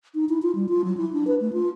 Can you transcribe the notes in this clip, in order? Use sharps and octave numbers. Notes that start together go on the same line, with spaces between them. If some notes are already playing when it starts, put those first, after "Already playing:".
D#4
E4
F4
G3
F4
F#3
E4
D4
B4
A3
F4